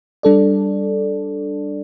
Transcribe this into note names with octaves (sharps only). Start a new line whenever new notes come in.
G3 D4 A4 D5